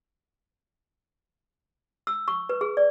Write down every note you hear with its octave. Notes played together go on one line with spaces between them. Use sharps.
E6
C#6
B4
G#4
D5